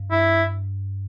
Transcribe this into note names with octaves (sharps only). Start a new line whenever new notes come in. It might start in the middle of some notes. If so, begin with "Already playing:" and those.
Already playing: G2
G2 E4